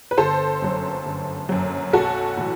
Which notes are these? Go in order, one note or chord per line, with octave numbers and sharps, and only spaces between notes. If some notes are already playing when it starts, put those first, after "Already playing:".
B4
G1 A4 C5
F#2 F#3
G1
F#2 F#3
B1 F#4 A4
A2 E3